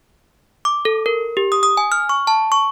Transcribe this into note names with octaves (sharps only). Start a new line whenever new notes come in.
D6
A4
A#4
G4
D#6
D#6
G#5
F6
C#6
A5
C#6